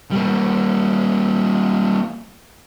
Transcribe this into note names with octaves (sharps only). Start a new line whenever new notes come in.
G3 A#3